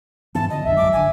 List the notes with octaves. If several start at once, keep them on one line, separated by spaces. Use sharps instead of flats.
G#2 E3 B3 A5
D3 F3 D#5
C2 F#2 D3 E5
A#1 F#3 G#3 D6
G1 D3 G#5